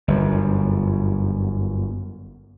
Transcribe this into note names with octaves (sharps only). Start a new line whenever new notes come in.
G1 F#2